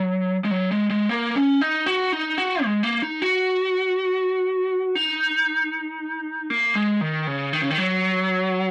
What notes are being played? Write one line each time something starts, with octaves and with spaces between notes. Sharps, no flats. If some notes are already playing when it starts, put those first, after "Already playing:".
Already playing: F#3
G#3
F#3
G#3
G#3
A#3
C#4
D#4
F#4
D#4
F#4
G#3
A#3
D#4
F#4
D#4
A#3
G#3
D#3
C#3
D#3
C#3
D#3
F#3